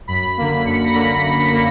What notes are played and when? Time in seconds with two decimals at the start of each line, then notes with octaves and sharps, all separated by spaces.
0.08 F#2 B5 B6
0.37 D3 A#3
0.65 F#2 C#7
0.75 B6
0.84 A#6
0.94 D3 A#3 B5 B6
1.23 F#2
1.52 A#3